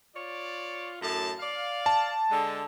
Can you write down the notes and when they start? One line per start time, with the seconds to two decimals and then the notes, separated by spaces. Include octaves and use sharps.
0.16 F4 C#5 D5
1.02 F#2 A2 A5
1.40 D5 F5
1.86 A5
2.30 D3 G#3